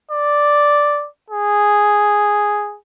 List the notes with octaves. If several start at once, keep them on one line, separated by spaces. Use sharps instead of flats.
D5
G#4